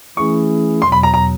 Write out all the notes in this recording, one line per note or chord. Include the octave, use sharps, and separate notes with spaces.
E3 A3 C#4 E4 G#4 C#6
E2 B2 F#3 C6
B5
A#5
A#5